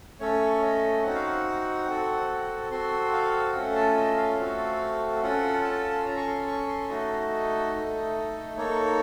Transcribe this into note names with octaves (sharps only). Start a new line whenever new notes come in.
A3 C#4 A4 C#5
D#5
C4 D#4 F#4 F#5
F5
F#5
C4 F#4 A4
C4 F#4 A4 C6
F5
A3 C#4 F4 A4 F#5
A5
D#5
F5
A3 C4 F#4 A4
C#4 F4 A4 F#5
A5
C6
C#4 A4 A#5
C#6
C6
C#6
C6
A3 D#4 F#4 A4 D#5
A3 D#4 A4
A#3 D#4 A4 C#5